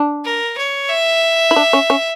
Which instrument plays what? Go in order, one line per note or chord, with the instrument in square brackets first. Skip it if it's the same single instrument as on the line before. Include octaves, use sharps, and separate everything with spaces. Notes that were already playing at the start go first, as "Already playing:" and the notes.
Already playing: [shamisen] D4
[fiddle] A#4
C#5
E5
[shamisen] E4
D4
C#4
C#4